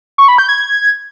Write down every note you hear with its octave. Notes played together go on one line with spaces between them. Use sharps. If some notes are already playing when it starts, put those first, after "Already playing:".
C#6
B5
G6
G#6